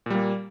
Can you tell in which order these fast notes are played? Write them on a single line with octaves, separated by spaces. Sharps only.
A#2 G3 A#3